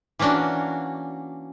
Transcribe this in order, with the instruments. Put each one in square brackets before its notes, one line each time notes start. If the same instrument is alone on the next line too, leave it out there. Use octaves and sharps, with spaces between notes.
[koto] E3 A#3 C#4 D4 F#4